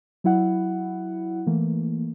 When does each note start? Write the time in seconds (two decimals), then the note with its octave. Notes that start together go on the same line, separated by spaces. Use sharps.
0.24 F#3 E4 F#5
1.47 E3 A3 A#3